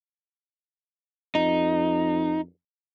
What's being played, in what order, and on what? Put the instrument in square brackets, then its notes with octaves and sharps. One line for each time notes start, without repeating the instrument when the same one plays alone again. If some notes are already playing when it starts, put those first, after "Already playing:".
[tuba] F2 [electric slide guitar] D#4